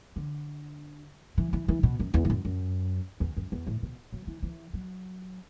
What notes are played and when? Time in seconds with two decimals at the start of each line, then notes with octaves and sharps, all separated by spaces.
0.16 D3
1.38 E3
1.53 E3
1.68 E3
1.83 B2
1.99 F#2
2.14 E2
2.25 A2
2.30 F#2
2.45 F#2
3.20 E2
3.37 F#2
3.52 E2
3.67 A2
3.82 B2
4.13 F#3
4.27 E3
4.43 E3
4.73 F#3